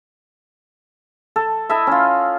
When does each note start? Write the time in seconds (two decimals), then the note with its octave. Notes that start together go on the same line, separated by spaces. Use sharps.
1.36 A4
1.69 E4 A4 D#5 E5
1.87 C#4 F4